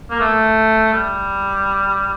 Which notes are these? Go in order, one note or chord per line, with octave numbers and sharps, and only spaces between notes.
A#3
A3
G3